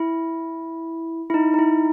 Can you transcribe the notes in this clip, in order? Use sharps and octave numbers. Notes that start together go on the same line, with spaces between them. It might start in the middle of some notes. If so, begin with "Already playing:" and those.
Already playing: E4
E4
D#4
D#4
E4